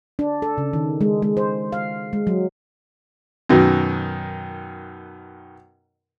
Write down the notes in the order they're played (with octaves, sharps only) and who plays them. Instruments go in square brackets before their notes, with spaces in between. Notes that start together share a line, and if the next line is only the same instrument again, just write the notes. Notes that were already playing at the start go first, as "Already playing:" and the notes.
[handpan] D4
A4
C#3
D#3
G#3
G#3
C5
F5
G#3
F#3
[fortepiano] F#2 B2 D#3